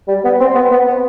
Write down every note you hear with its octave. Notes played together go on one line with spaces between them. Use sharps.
G3
B3
C4
B3
B3
B3